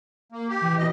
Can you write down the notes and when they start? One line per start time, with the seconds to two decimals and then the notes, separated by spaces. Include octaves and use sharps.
0.32 A#3
0.49 G4
0.61 E3
0.78 D#2 B2 D#5